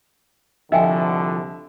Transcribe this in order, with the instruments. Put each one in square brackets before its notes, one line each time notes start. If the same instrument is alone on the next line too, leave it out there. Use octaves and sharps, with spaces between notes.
[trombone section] C2 D3 [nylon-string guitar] F3 F#4 [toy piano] D#5 G5 G#5 [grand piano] E5